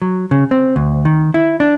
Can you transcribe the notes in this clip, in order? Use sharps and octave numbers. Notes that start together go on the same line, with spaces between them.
F#3
C#3
C4
D2
D#3
E4
D4